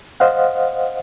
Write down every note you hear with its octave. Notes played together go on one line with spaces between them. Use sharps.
C5 D#5 F5 F#5